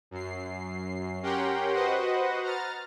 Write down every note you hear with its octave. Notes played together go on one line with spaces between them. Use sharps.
F#2 C7
C#4 G4 A#4 F#5 G5 C6
F#4 B4 C5 D#5 F#5
A#5 F6 A6